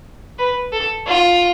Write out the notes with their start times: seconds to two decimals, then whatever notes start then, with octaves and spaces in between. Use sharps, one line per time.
0.39 B4
0.72 A4
1.07 F4